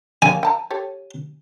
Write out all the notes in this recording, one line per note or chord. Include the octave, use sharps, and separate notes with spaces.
A#3 C#4 G4 G#5
G5 A5 A#5
G4 A4 C#5